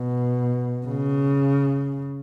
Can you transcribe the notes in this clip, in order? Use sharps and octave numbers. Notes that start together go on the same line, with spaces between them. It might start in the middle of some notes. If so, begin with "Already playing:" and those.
Already playing: B2
C#3